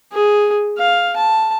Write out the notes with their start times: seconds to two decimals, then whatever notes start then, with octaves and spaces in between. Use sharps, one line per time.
0.12 G#4
0.78 F5
1.16 A5